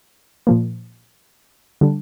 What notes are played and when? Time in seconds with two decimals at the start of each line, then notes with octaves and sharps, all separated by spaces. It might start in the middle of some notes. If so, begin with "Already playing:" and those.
0.47 A#2 F3 A#3
1.81 D3 G3 D4